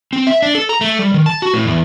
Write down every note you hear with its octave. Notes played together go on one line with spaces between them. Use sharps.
C4
E5
D4
A4
A#5
A3
G3
D#3
A5
F#4
A2
E2